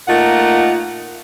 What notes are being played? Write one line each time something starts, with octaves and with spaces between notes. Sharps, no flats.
A#2 A3 A#3 D#4 F4 F#5